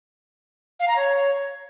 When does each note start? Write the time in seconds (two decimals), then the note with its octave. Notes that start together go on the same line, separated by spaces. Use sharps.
0.79 F5
0.88 A#5
0.96 C#5